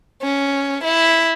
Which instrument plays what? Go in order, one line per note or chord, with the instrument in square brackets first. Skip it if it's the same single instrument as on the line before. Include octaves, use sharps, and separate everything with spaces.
[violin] C#4
E4